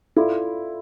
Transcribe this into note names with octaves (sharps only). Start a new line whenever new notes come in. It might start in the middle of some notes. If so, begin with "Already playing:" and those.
E4 F4 A4 D5 F5 C6